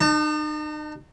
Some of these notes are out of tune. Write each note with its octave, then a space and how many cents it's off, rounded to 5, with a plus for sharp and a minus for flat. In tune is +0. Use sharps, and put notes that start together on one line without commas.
D#4 -40 A5 +30